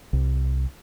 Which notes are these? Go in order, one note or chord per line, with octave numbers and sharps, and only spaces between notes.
C2